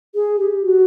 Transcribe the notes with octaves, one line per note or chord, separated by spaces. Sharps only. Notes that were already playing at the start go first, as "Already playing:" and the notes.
G#4
G4
F#4